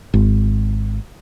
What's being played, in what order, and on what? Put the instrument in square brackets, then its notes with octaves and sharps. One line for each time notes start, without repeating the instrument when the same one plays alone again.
[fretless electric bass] G#1